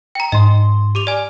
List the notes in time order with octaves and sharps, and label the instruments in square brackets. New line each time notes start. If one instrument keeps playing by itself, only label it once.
[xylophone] G5 A#5
[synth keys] G#2 C6 [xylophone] D#5
[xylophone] G4 D6 F7
[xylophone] D5 G#5 [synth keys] F6